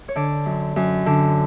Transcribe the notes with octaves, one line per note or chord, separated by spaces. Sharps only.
C#5
D3 D5
F#2
F#2
D3